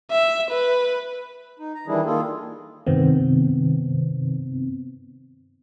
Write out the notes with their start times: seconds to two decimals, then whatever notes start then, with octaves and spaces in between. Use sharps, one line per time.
0.11 E5
0.51 B4
1.59 D#4
1.75 A#5
1.88 D#3 E3 G3 D4 E4 G#4
2.05 D#3 A#3 F4 G#4 A4
2.87 G2 C3 D#3 B3 C4